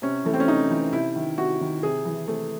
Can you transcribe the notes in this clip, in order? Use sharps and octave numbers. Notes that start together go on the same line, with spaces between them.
C3 C#4
E3 A3
C4
C#4
C3 D#4
E3
C3 E4
D#3
C3 F#4
D#3
C3 G#4
E3
C3 A3